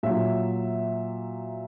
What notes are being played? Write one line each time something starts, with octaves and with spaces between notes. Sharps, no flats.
A#2 F#3 E5